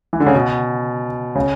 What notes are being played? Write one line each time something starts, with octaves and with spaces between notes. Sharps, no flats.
E3
D3
C#3
B2
C#3